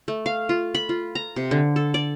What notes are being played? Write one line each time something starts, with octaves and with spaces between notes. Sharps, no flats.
A3
F5
F4
B5
F4
A#5
C3
D3
A4
D5